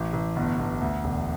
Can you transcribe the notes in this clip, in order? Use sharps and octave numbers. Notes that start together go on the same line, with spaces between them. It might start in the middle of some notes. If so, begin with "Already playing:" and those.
Already playing: A1
A1
G1
G1
D2
E1